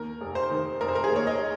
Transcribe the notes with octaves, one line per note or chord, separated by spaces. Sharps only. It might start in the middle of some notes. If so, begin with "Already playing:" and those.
Already playing: D#2 A#4
F1
C5
D#3
F1 A#4
C5
A#4
G#4
D#2 C#5
D#5